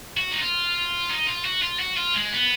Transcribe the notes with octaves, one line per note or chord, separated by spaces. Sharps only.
F#4
D#4
F4
D#4
F4
F#4
F4
F#4
F4
G#3
B3